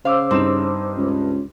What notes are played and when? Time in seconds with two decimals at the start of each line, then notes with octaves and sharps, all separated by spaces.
0.05 C#3 C5 F5 D6 E6
0.31 G2 C4 D#4 E7
0.97 C#2